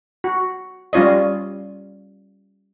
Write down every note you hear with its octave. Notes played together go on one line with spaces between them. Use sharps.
F#4
G3 C#4 F4 C#5 D#5